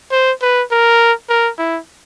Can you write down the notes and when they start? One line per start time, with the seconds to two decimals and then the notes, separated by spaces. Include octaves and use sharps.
0.12 C5
0.42 B4
0.71 A#4
1.29 A#4
1.59 E4